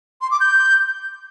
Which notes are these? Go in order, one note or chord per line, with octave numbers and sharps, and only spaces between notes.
C6
D6
G6